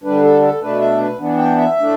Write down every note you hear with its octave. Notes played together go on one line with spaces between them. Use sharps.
D3 G3 D4 B4
A4
A4
B2 A3 D4 B4
E5
B4
E3 B3 D4
G5
E5
A2 A3 D4